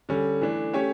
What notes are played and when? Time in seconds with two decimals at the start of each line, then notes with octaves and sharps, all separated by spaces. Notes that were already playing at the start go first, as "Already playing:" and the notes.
0.09 D3 G3 C#4
0.41 E3 A3 D4
0.73 A3 C#4 G4 C#5